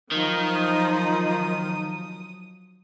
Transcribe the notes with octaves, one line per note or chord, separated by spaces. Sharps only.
D#3 F3 F#3 D#4 D#6